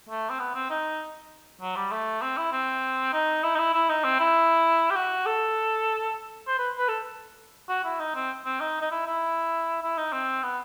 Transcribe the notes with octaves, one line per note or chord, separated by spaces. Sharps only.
A3
C4
B3
C4
D#4
F#3
G3
A3
C4
E4
C4
D#4
E4
D#4
E4
E4
D#4
C4
E4
G4
F#4
A4
C5
B4
B4
A4
F#4
E4
D#4
C4
C4
D#4
D#4
E4
E4
E4
D#4
C4
B3